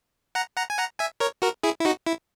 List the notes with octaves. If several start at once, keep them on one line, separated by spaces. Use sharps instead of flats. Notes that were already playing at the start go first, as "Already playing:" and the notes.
F#5 A#5
F#5 A#5
G#5
F#5 A#5
E5 G#5
A#4 C#5
F#4 A#4
E4 G#4
E4
D#4 F#4
E4